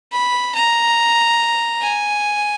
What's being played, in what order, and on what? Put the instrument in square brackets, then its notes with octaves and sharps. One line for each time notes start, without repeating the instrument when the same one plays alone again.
[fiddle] B5
A#5
G#5